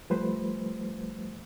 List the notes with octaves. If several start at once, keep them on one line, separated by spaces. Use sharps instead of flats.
F3 G3 A3 B4 C5